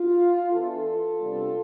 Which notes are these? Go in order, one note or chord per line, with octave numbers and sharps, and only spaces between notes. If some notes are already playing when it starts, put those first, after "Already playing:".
Already playing: F4
E3 B3 D4 F4 A4
C3 G3 B3 D4